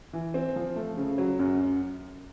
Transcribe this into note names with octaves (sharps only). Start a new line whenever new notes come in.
E3
C4
F3
A3
C#3
F#3
F#2